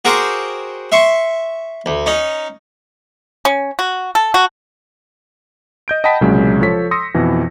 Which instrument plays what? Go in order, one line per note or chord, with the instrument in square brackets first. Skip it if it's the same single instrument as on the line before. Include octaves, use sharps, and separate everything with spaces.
[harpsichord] F#4 G#4 A#4 C5 G5 D6
E5 C6 C#6
D2
C#4 D#4
[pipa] C#4
F#4
A4
F#4
[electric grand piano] D#5 G6 D7
D#5 F#5 G5 A5 B5 B6
C2 A#2 C#3 F#3 G#3 C#4
F3 A4 C#5 B6
C6 D#6 E6 A#6 C#7
F2 B2 E3